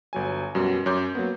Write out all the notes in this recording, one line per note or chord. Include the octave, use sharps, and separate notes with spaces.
G1 F#3 G#5
F#2 B2 G3
F#2 C#5 D6 G6
F#3 A#3 B3